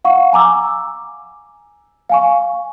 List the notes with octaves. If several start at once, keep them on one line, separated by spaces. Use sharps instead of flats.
F5 F#5 C#6
G#5 A#5 D6 E6
F5 G#5 C#6